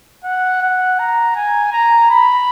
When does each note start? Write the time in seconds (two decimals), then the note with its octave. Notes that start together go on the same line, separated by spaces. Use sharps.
0.24 F#5
0.62 F#5
0.99 A#5
1.36 G#5
1.73 A#5
2.10 B5